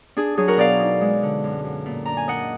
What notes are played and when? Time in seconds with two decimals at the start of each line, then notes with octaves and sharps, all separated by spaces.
0.17 D4 G#4
0.37 F#3 G#4
0.48 F#4 A#4
0.57 B2 D5 F5
0.80 D#4
1.01 G#3
1.23 D3
1.44 F#2
1.65 F#2
1.86 A#2
2.05 D4 A#5
2.17 G#5
2.28 D4 D#5 F#5